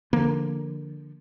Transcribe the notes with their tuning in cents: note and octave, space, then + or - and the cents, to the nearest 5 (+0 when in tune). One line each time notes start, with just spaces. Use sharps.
D3 +0 F3 -20 A#3 +0